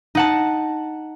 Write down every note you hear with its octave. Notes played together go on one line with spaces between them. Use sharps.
D#4 F#5 A5